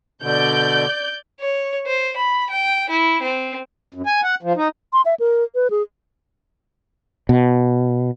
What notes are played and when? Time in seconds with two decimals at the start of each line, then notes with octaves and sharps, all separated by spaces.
0.22 B2 D3 D5 G6
1.40 C#5
1.87 C5
2.17 B5
2.50 G5
2.89 E4
3.22 C4
3.94 F#2
4.07 G#5
4.23 F#5
4.43 F3
4.56 D#4
4.93 C6
5.05 E5
5.20 A#4
5.55 B4
5.70 G#4
7.29 B2